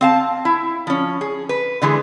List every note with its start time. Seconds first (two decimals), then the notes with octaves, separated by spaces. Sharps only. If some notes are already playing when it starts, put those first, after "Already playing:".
0.01 C4 F5 A5
0.45 E4
0.87 F3 C#4
1.21 G#4
1.49 B4
1.82 D3 E3 G#3 G#4